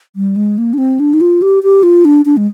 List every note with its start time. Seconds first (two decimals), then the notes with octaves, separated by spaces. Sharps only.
0.16 G3
0.36 G#3
0.58 A#3
0.74 D4
0.78 C4
1.00 D4
1.14 D#4
1.21 F4
1.42 G4
1.63 G4
1.83 F4
2.05 D4
2.25 D4
2.37 G#3